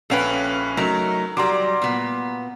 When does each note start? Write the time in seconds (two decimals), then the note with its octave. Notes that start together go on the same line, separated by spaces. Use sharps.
0.10 A#1 C#4 A4 B4 F5 G5
0.77 F#3 A3 D#4 A#4
1.37 F#3 G3 A#5 C6 D6
1.82 A#2 B3